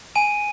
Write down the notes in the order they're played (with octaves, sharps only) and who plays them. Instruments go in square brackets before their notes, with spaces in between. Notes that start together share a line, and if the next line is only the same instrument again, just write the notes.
[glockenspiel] G#5 D#7